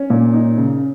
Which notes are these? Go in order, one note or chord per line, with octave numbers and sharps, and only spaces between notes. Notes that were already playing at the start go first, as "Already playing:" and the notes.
Already playing: C#4
A#2
D#4
C#3